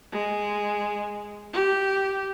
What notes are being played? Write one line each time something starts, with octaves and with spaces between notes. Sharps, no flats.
G#3
G4